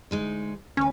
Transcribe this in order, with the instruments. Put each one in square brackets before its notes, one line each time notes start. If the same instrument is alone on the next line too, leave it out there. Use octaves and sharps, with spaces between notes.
[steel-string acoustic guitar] D2 G#3 D#4
[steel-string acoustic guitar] D2 B4 [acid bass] C#4